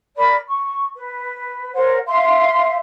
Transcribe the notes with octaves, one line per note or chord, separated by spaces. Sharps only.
A#4 D5 B5
C#6
B4
A#4 C5 C#5 F#5
E5 F5 C6